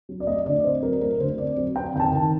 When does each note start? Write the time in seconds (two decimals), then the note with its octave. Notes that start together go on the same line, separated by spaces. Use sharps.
0.09 F#3
0.20 D5
0.27 A3 D#5
0.46 D3 D5
0.64 C4 C5
0.83 F#3 A#4
1.01 A3 A#4
1.20 D3 C5
1.38 C4 D5
1.57 F#3
1.76 C4 G5
1.94 D#3 G5
2.00 A5
2.12 D#3